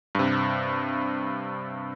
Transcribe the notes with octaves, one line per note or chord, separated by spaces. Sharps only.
G2 C3